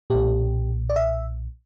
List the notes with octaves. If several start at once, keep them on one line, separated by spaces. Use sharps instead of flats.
B1 A#2 G4
D5
E5